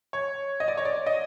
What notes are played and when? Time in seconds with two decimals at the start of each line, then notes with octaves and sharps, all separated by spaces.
0.13 C#5
0.60 D#5
0.68 D5
0.77 C#5
0.85 D5
1.06 D#5